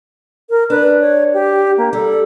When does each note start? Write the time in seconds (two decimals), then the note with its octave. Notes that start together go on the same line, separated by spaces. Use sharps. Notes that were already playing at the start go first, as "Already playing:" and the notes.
0.50 A#4
0.70 D4 B4
1.00 C#5
1.33 G4
1.78 A#3
1.93 G3 A4